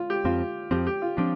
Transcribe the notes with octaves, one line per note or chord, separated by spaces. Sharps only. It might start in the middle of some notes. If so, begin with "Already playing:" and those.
Already playing: F4
G4
F2 F3 C4 F4
F2 F3 C4 G4
G4
F4
F3 C4 D4